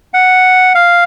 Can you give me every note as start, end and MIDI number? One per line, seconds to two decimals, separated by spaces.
0.14 0.73 78
0.75 1.04 77